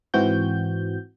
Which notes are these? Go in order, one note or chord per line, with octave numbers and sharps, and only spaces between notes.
G#2 E3 C4 F#4 G6